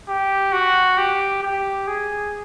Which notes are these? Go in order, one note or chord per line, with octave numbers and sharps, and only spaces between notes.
G4
F#4
G4
G4
G#4